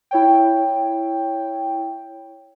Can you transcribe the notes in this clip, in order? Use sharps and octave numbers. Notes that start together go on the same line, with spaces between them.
E4 C#5 G5